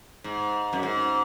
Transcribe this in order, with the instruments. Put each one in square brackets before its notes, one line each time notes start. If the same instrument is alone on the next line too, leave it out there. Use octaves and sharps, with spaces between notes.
[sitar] G#2
F#2
G#2